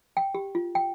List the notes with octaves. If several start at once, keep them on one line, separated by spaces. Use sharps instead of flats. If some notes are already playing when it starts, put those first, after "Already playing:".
G5
G4
F4
G5